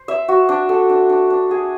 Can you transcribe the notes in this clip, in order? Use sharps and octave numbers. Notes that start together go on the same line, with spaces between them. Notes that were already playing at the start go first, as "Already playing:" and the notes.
Already playing: C5
E5
F#4
D4
A4
D4
D4
D4
G#4